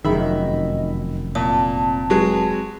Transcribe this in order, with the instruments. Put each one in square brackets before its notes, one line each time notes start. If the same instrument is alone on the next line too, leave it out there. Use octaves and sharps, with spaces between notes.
[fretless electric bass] F1 F#2 D#3 [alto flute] G#4 [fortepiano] E5 B5
[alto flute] D#5
[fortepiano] A#2 [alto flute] C4 [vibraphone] A5
[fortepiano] F#3 G#3 B4